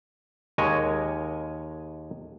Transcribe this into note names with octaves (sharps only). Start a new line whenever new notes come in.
D#2 G#3 A#4 C#5 D#5 G#5